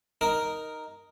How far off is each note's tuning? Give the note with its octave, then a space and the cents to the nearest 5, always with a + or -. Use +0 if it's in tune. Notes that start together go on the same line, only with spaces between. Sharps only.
D#4 +0 A#4 +0